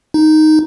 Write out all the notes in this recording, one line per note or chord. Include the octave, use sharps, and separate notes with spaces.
D#4